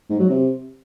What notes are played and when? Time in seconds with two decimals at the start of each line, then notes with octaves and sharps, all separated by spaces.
0.09 G#2
0.19 F#3
0.29 C3